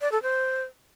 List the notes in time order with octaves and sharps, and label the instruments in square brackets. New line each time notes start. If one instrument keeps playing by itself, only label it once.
[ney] D5
A4
C5